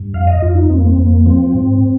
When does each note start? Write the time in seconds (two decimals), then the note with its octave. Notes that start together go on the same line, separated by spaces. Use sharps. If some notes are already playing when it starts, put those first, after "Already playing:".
Already playing: G2
0.13 F2 F5
0.27 D#5
0.42 F2 F4
0.55 D#4
0.70 F2 C4
0.77 A#3
0.85 C4
0.97 F2 A#3
1.26 F3 C4
1.54 G#2